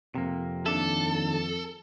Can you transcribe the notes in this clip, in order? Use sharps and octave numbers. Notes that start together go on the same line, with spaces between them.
F2 C3 A#3
D#2 D4 A4 E5